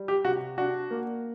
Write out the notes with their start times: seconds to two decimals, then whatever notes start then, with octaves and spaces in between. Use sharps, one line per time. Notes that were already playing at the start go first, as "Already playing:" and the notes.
Already playing: G3
0.08 G4
0.24 C3 F#4
0.58 D4 F#4
0.91 A#3